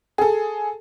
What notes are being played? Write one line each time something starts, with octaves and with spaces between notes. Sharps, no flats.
G#4 A4